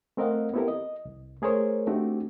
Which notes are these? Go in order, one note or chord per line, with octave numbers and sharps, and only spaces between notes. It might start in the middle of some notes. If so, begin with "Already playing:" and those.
A3 C4 A#4 D#5 F5 F#5
B3 C4 E4 G4 A4 A#4
D#5
C2
A3 G#4 A#4 C5 C#5
A3 C4 D4 D#4 F#4 G4